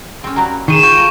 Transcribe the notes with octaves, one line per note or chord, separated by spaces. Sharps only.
C4 C#4
F#3 G3 A#3
D#3 G#4 C5 C#6 D#7 E7
F4 G5 C#6
A3 A#4